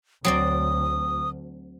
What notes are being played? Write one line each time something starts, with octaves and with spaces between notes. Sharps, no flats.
D2 F#3 C4 D5 D#6